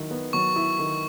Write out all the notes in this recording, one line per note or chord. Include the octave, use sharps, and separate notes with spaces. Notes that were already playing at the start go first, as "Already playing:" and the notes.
Already playing: D#3 F#3 E4
B3
F#3 C#6
E4
D#3